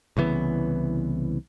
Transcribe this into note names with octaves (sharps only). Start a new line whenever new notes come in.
C2 C#3 E3 B3